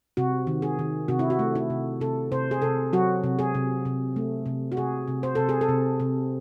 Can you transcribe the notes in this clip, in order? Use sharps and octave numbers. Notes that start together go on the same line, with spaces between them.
C3 F#4
D#3
G#4
D#3
C3 F#4
E4
F#4
A3
E4
C3
C3 A4
C3 C5
G#4
C3 A4
F#3 F#4
C3
G#4
C3
C3
A3
C3
F#4
C3 G#4
C3
C5
C3 A4
G#4
A4
C3
C3